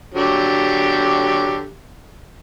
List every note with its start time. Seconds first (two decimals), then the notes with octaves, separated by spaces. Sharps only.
0.14 D3 F#3 G4